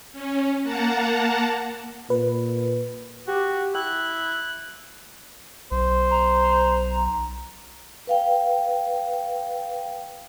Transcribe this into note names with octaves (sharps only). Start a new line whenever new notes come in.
C#4
A#3 F#5 A5 A#5
A#2 B4
F#4 G4
E4 F#6
B1 C5
A#5
B4 F5 G5